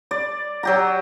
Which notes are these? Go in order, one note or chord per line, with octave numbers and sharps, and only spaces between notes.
D5
F#3 G4 A#5